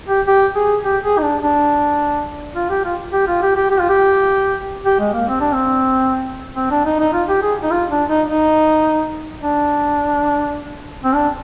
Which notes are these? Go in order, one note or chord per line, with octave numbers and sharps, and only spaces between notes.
G4
G4
G#4
G4
G#4
D#4
D4
D4
F4
G4
F4
G4
F4
G4
G4
G4
F4
G4
G4
G#3
A#3
C4
D4
C4
C4
D4
D#4
D#4
F4
G4
G#4
D#4
F4
D4
D#4
D#4
D4
C4
D4